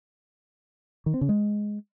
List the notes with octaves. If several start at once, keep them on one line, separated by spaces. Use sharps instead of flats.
D#3
C4
C#3
G#3